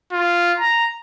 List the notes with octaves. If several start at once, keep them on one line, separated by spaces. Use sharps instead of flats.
F4
A#5